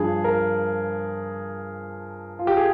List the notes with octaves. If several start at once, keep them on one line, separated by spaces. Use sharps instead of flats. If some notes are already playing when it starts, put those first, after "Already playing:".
Already playing: G2 F3 G#4
A#4
F4
G4
G#4